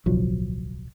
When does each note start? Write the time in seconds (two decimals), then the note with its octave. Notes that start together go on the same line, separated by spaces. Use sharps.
0.06 D1 B1 F3 F#3